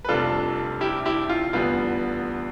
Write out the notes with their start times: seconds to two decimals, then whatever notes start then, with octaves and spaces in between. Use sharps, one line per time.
0.05 B4
0.09 F1 F2 C3 G3 D4 F4 A4
0.81 E4 G4
1.05 E4 G4
1.29 F4
1.53 F1 E2 D3 G3 B3 F4